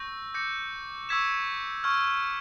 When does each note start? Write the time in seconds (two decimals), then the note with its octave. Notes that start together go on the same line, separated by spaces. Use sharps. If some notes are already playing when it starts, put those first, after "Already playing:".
Already playing: C#6 E6 G6 A#6
0.34 D6 G6 A#6 C#7
1.09 C#6 E6 G#6 B6 E7
1.84 C#6 F6 G#6